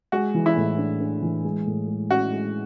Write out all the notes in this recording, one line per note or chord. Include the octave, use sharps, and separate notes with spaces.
G#3 F#4
E3
E4
A2
D4
D4
E3
G#3
A2
G#3
C#4 F#4
G#3